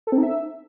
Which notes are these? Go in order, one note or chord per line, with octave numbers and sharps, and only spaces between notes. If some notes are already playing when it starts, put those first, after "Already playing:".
A4
C4
D#4
E5